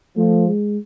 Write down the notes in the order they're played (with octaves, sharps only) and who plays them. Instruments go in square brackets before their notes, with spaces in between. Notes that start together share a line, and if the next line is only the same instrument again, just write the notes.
[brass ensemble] F3 [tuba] A3
[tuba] G#3